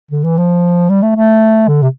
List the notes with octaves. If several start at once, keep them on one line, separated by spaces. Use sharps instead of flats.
D3
E3
F3
G3
A3
A3
D3
C3